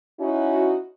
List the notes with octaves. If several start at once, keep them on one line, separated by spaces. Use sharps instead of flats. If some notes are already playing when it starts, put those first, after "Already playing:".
C#4 D#4 E4 F#4